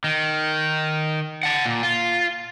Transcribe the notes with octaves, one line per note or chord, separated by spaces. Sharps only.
D#3
F#5 A5
A#2
F4